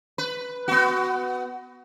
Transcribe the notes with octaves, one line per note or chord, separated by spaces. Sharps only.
B4
B3 F#4